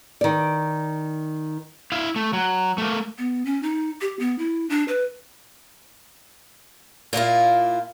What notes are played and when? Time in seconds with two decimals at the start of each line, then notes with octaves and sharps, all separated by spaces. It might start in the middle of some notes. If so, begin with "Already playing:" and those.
0.21 D#3 D5
1.92 E4 F5
2.16 A3
2.33 F#3
2.78 A3 A#3
3.18 B3
3.45 C#4
3.63 D#4
4.01 G4
4.19 B3
4.38 E4
4.69 D4
4.88 B4
7.13 A#2 A#3 E4 F4